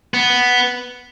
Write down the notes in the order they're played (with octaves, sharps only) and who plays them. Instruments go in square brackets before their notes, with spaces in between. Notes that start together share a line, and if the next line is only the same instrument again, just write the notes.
[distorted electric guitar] B3